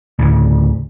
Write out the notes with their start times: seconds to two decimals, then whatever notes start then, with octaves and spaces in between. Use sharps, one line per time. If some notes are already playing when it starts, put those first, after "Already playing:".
0.19 D2 A2 C#3